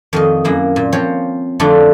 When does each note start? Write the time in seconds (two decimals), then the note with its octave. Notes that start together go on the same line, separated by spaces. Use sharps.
0.13 F2 D#3 D#5
0.44 F#2 A#3 E4
0.76 A#2
0.92 F3 C4 C5 C#5
1.60 F2 D3 A3 D4 F4